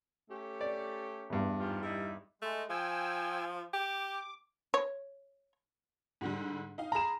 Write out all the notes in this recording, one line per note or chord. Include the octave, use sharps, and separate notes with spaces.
A3 C#4 G4
D5
E2 G2
G#2 F4 G4
G3 D#4 E4
G#3 A3
F3 G5 G#5 E6
G4 D6
C#5
G#2 D3 G3
D#4 F5
G#4 A#5 B5 E7